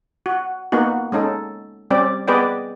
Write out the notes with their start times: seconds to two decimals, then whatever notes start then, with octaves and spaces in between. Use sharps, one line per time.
0.26 F#4
0.72 A#3 B3 D#4 F#4
1.12 G#3 C#4 D#4 A4
1.90 G3 C4 C#4 G4 D5
2.28 B3 G#4 B4 D5 D#5 G5